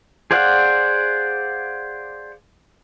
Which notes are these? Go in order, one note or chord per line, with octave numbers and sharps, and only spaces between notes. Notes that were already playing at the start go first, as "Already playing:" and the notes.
G#4 C5 D5 F5 F#5